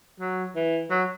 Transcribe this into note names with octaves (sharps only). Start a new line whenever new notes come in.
F#3
E3
F#3